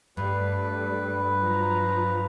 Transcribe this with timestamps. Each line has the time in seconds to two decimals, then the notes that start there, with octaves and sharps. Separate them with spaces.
0.17 G2 G3 A3 B4
1.42 F3 F#3 A#5